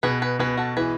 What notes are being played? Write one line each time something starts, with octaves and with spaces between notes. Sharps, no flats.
B2 G#4 B4
G#4 B4
B2 G#4 B4
F#4 A4
E3 G#4 B4